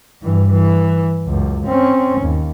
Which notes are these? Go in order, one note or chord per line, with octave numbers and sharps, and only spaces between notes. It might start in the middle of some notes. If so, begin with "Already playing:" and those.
G2 E3
E3
C#2 F#2
C4 C#4
D#2